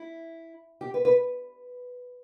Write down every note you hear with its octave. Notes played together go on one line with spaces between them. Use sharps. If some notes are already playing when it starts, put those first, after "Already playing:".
Already playing: E4
G4
B4
B4